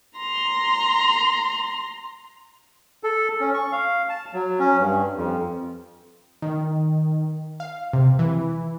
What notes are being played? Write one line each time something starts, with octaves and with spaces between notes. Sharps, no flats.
A#5 C6
A4
C#4
C#6
F5
A5
F#3
C#4
G2
F2
D#3
F5
C3
E3